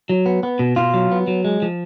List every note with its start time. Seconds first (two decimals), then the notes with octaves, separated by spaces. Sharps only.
0.09 F#3
0.26 B3
0.43 B3
0.59 B2
0.76 B2 F4
0.94 F#3
1.11 B3
1.27 F#3
1.45 G#3
1.62 F3